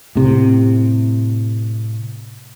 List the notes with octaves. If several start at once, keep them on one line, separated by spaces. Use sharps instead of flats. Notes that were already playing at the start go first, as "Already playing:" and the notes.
A2 C3